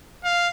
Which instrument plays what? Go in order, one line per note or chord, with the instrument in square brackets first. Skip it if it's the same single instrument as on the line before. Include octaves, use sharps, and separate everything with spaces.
[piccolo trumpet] F5